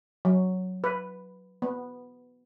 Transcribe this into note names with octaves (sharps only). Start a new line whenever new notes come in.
F#3
B4
B3